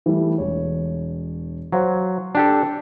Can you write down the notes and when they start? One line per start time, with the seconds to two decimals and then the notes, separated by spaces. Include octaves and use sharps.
0.06 E3 G3 A3
0.38 E1 C#5
1.72 F#3 C5 F5 C6
2.35 D4 G4 A4